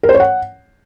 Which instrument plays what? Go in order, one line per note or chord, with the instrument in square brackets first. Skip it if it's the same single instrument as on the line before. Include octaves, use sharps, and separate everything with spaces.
[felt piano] A#4
C5
C#5
F#5